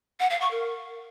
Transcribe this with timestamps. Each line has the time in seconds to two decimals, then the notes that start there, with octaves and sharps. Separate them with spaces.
0.19 F#5
0.30 F5
0.40 C#6
0.51 A#4